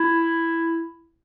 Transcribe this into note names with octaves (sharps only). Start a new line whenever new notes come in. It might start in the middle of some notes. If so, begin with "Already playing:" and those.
Already playing: E4